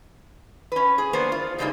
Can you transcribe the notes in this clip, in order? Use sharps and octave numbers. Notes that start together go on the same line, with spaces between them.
C#4 B4
G#4
A#3 B3 D4 C5
F4
G2 C#3 G3 G#3 A#3 D#4